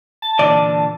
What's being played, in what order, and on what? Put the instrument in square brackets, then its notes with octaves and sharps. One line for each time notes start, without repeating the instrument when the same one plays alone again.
[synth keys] A5
[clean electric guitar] A#2 D3 E3 [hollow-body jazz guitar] D5